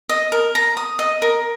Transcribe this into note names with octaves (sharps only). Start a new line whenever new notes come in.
D#5
A#4
A#5
D#6
D#5
A#4